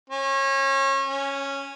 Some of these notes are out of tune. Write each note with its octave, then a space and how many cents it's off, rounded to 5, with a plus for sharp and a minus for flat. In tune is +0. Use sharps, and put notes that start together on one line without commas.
C#4 -30
C#4 -5